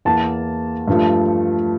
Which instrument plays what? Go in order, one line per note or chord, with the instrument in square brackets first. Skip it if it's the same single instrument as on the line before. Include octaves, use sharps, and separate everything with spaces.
[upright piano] E2 E3 A#3 A5
G2 F3 A3